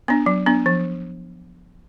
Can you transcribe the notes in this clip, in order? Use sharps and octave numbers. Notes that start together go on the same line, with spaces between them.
B3 D4
F#3
B3 D4
F3